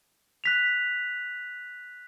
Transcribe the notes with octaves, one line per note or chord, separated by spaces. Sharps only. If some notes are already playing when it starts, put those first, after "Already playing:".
F#6 B6 F7